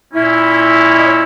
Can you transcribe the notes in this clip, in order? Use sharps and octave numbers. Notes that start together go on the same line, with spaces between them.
A#2 A#3 C#4 E4
D#5
C#5